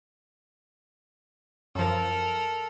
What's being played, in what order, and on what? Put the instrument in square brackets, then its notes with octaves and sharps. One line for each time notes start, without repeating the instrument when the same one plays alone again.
[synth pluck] F#2 F3 [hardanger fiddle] A4 A#4